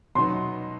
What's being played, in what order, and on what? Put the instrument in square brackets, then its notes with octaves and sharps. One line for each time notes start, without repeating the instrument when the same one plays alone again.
[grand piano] B2 F#3 B3 D#4 [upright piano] C6